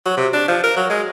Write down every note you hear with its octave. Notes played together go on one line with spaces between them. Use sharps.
F#3
C3
D4
F3
A#4
F#3
G#3